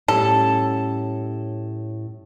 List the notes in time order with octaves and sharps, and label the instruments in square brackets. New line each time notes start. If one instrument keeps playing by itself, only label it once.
[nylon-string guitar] A2 G3 C#4 [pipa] A4